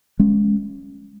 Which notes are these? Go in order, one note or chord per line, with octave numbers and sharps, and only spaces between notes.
G#3 C#4